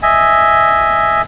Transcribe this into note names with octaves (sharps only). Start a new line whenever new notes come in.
D#5 E5 G#5